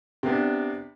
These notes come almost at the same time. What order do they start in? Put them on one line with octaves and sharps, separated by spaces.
C3 B3 D4